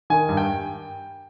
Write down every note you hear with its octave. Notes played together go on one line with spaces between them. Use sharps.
D#3 G#5
G2
G5